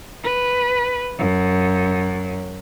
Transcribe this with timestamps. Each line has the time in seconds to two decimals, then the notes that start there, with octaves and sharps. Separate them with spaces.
0.24 B4
1.18 F#2